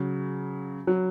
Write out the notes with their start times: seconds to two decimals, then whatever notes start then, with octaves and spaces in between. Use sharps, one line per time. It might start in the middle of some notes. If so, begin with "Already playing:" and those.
Already playing: C#3 F#3
0.87 F#3